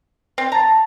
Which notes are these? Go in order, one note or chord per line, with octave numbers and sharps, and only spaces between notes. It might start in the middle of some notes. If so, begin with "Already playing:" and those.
C4
A5 A#5 A6
A5